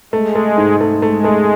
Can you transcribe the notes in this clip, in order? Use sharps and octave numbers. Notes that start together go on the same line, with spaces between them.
G#3 A3
A3
G#2
A3
G#3 A3
A3